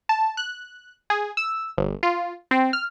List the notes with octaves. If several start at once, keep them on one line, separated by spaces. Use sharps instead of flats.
A5
F#6
G#4
E6
G1
F4
C4
F6